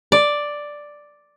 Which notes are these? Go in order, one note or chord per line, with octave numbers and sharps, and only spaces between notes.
D5